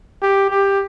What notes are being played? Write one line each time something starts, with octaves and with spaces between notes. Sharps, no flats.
G4
G4